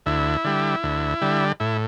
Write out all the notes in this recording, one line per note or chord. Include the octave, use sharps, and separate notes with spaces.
D2 E4
D3 G3
D2
D3 G3
A2 E4